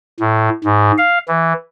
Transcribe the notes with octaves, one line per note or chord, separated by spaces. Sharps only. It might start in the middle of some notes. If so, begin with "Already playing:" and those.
A2
G#2
F5
E3